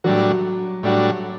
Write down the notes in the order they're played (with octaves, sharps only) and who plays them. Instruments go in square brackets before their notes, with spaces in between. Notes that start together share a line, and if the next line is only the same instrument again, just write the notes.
[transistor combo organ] A2 G3 D4 F#4 [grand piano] F#3
[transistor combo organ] A2 G3 D4 F#4